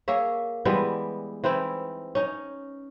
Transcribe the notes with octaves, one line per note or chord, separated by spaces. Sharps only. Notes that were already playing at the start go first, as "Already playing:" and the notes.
A#3 G#4 C#5 E5
E3 G3 G#3 B3
E3 C4 D#4 E4
C#4 D#4